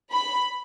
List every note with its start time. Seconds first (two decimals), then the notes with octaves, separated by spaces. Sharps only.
0.11 B5